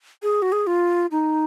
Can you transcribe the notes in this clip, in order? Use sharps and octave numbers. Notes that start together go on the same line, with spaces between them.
G#4
F#4
G#4
F4
D#4